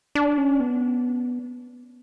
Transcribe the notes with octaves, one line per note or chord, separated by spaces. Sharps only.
D4
C#4
B3